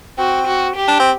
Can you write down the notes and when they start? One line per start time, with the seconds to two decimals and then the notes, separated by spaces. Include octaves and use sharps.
0.18 C4 F#4
0.47 F#4
0.76 G4
0.88 D4
0.99 C4